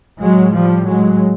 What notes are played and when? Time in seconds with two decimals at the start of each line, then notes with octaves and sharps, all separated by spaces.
0.21 A2 F#3 G#3
0.55 F3 G3
0.88 F#3 G#3